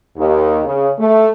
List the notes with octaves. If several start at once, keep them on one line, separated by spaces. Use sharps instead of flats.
D#2
C#3
A3